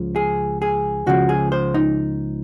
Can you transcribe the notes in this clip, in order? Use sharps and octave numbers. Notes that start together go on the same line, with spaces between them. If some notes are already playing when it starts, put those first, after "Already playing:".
Already playing: C#2 C#3 F3
G#4
G#4
C#2 C#3 F3 F#4
G#4
C5
D#4